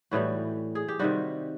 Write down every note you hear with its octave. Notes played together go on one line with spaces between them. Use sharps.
A2 E3 G3 F#4
G#4
G4
C3 D#3 G3 F#4